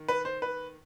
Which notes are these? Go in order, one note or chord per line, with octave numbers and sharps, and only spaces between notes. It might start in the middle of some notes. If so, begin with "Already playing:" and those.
Already playing: D#3
B4
C5
B4